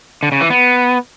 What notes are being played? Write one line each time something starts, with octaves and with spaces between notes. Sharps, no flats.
D3
C#3
E3
B3